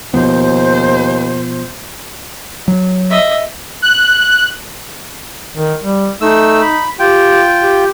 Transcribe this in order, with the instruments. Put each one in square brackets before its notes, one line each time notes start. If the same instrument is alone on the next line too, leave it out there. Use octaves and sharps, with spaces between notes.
[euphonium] D#2 [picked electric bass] B2 F3 B3 [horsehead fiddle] C5
[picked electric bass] F#3
[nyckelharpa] D#5 E5
[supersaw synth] F#6
[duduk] D#3
G3
[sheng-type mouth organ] A3 E6 [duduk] D#4
[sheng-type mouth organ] B5
[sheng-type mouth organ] F4 G5 [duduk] G4
[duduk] G4